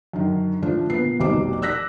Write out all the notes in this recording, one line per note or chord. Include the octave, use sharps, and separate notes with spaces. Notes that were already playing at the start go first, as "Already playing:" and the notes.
F#2 D3 D#3
D3 F3 A3 D4
A#2 B3 C7
F1 C2 B2 D#4 C5 D6
D5 E6 F#6 A#6 B6